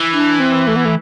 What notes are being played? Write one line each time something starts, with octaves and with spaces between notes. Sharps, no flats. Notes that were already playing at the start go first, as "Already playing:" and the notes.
Already playing: E3
D4
C4
A3
B3
A3